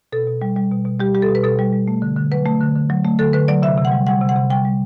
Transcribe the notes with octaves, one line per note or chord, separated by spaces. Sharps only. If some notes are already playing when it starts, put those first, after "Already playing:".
B2 A4
B2
G3
G3
B2
B2
G3 G4
G3 G4
A4
B2
B4
B2 A4
G3
G3
A3
D3
D3
F#3 B4
A3
D3
D3
F#3
A3
D3 A4
D3 B4
F#3 D5
C3 E5
C3
F#5
G3
G3 F#5
C3
F#5
C3
G3 G5
G3